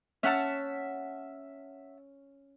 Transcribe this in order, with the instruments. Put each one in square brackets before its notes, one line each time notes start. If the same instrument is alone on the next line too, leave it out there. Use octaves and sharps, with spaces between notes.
[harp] C#4 [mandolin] E5 F#5 A5